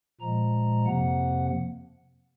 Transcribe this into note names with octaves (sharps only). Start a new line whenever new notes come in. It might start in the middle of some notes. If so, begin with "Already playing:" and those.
A#2 F3 G#3 A#5
F2 C3 F3 A#3 F#5